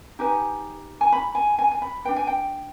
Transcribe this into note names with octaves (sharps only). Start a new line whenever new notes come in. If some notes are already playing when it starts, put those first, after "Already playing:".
D#4 G4 B4 G#5
G#5
B5
G#5
G#5
G#5
B5
D4 G#4 B4 G5
G#5
G5